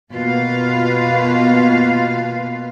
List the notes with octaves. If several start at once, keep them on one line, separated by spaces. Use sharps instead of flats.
B2 A#3 F4 B4 F5